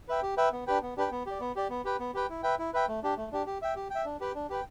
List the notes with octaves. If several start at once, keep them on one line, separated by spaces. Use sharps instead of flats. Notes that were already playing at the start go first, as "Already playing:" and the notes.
B4 E5 G5
G4
B4 E5 G5
B3
D4 G4 B4 G5
B3
D4 G4 B4 G5
B3
G4 D5
B3
G4 D5
B3
G4 B4 G5
B3
G4 B4 G5
E4
B4 E5 G5
E4
B4 E5 G5
A3
D4 G4
A3
D4 G4
G4
E5 G5
G4
E5 G5
D4
G4 B4 G5
D4
G4 B4 G5